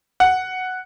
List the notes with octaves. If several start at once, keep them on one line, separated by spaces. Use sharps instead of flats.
F#5